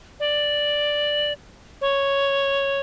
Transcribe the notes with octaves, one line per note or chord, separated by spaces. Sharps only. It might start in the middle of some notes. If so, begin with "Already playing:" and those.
D5
C#5